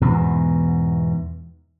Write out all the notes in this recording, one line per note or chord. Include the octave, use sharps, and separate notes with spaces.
E2 G#2 B2